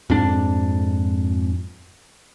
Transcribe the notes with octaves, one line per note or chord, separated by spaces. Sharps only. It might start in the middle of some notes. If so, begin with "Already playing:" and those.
F2 G#2 D4